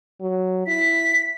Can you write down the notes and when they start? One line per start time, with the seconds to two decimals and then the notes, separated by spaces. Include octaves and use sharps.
0.21 F#3
0.67 E4 B6